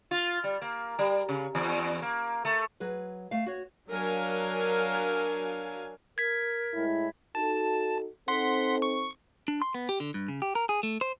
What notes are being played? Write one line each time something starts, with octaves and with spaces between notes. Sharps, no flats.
F4
G3
A#3
G3
C#3
E2
A#3
A3
F#3 G#4 B4
A3 F5
F#4 C#5
F#3 D4 A#4 F5 G#5
A#4 G#6 B6
A2 G#3 E4
D#4 F#4 A4 A5
C4 D#4 A4 F#5 C6 B6
C#6
D4
C6
B3
G4
D3
G2
C#3
G4
A#4
G#4
A3
C5